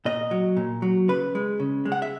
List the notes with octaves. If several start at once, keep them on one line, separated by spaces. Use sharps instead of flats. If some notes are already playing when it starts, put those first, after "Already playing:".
A#2 D#5
F#3
A#2
F#3
C#3 B4
G#3
C#3
G#3
F#5
E5